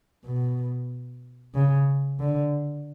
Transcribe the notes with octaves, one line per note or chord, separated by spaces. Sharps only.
B2
C#3
D3